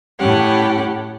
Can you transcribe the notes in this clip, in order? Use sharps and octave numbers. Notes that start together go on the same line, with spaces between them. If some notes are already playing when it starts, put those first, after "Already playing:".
A2 C#4 G4 F#5